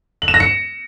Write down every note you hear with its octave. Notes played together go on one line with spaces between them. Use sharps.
F#7
E7
A#6
C#7